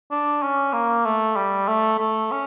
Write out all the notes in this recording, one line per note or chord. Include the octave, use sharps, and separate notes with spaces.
D4
C#4
A#3
A3
G3
A3
A3
C#4